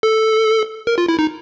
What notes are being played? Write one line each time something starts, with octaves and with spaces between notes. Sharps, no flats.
A4
A#4
F4
E4
D#4